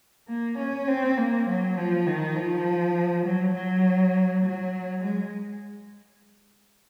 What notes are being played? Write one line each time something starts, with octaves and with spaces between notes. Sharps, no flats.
A#3
C#4
C4
A#3
F#3
F3
D#3
F3
F#3
F#3
F#3
G#3